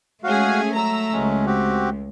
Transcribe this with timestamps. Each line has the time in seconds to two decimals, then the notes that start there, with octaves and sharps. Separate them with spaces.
0.24 G#3 A3 C#4 F#4 G#4 F5
0.74 F#3 A#5 E6
1.13 C#2 F#3 G#3 C#4
1.46 C4 F#4 G4